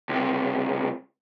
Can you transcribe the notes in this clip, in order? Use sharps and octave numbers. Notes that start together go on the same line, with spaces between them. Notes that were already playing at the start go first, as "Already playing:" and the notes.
C#2 C3